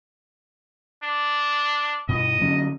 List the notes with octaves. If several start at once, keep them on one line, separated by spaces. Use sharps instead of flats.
D4
G2 B2 D#5
D3 F#3 C#4